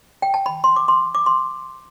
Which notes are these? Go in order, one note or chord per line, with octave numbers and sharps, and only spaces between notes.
G5
A5
B5
C6
D6
C6
D6
C6